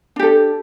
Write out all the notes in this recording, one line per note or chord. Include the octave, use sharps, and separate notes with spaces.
D4 G4 A4